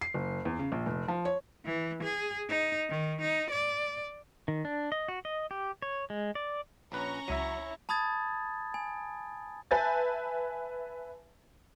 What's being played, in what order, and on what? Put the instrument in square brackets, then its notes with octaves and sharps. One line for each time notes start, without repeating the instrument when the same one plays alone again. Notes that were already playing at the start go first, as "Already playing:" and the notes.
[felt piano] C7
F#1
E2
C#3
A#1
F1
F3
C#5
[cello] E3
G#4
D#4
D#3
D#4
D5
[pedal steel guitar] D#3
D4
D#5
F#4
D#5
G4
C#5
G#3
D5
[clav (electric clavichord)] A#1 B4 [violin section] C#4 A#5 C#6
[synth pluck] C#2 A#6 D#7 [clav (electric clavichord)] F#3 E5 [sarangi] E4
[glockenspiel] A5 B5 D#6 G#6 A6
G#5
[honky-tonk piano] B4 E5 G#5 A5 G6 A6